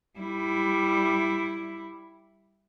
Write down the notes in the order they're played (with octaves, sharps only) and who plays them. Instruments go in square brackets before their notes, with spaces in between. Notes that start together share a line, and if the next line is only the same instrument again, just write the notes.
[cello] G3 E4